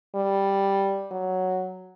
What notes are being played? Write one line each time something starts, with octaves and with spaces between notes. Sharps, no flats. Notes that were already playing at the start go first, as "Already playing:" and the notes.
G3
F#3